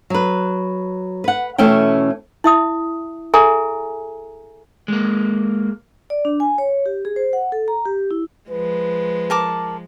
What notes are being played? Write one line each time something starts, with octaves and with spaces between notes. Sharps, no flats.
F#3 B4
B4 F#5
B2 E3 A3 C#4 E5 G5
E4 E5 D#6
G#4 A4 E5 G#5 A#5
G#3 A#3
D5
D4
G#5
C#5
G4
G#4
C5
F#5
A4
A#5
G4
E4
F3 G#3 B4
A#4 A5 D6